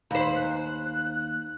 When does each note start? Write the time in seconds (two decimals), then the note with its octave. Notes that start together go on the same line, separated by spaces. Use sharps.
0.11 D#2 C5 B5
0.36 F#6